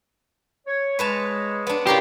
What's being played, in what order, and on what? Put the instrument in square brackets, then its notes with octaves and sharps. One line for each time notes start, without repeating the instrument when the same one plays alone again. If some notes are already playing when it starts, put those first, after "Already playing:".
[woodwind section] C#5
[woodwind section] G#3 [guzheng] B4 C#5 A5
[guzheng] B3 D4
[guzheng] C#3 A#4 C6 [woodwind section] E4 D5 [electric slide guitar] G4